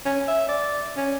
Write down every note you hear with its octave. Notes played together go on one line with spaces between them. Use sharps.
C#4
E5
D5
C#4